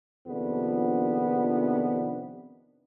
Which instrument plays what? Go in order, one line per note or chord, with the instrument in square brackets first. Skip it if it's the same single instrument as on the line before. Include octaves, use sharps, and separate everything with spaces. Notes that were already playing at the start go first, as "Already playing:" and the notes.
[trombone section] A#1 F2 C3 D#3 B3 D4